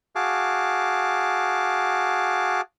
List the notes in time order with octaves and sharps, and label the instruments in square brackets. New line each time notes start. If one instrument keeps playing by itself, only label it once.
[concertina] F#4 G#4 F5 A5 D6